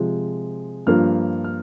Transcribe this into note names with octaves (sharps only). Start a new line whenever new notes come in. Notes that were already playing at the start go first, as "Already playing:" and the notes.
Already playing: C3 F3 G#3
G2 F3 A#3 F6
F6